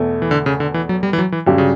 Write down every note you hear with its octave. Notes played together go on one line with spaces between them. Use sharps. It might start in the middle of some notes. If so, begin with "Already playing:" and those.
Already playing: E2 B2 A3
E3
D3
C#3
D3
E3
F#3
G3
E3
F#3
E3
G2 D3 F#3 C#4 G4 D5
C#3